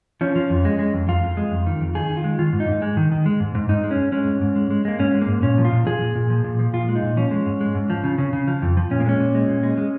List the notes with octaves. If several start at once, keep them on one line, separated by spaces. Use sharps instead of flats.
F3 C#4
F3
F2
G#3
G#3
F2
F2 F4
F2
G#3
F2
D#3
F2
D#3 G#4
D#3
F4
G#3
D#3 F4
G#2
D#4
G#2
G#3
D#3
D#3
G#3
G#2
G#2
G#2 D#4
G#3
C#4
G#2
G#3 C#4
G#2
G#2
G#3
G#3
G#3 A#3
G#2 C#4
G#3
A#3
G#2
A#2 C#4
F3
F4
A#2
F3 G#4
A#2
A#2
F3
A#2
F3
A#2 F4
G#3
D#4
A#2
F3 C#4
G#3
G#2
G#3
G#2
F3
C#3
C#3
C#3
F3
F2
F3
A#2 C#4
A#3
G#3 C#4
A#2
G#3
A#2
G#3
G#3